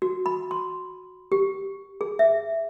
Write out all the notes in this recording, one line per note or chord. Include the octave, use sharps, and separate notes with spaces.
F#4
B5
C6
G4
G#4
E5